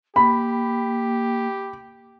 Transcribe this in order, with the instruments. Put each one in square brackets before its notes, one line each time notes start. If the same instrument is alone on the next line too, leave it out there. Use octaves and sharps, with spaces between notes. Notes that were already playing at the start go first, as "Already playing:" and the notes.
[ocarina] A#3 [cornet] G4 [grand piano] B5